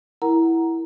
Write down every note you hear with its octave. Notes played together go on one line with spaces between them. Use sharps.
E4 A#4 F#5 A#5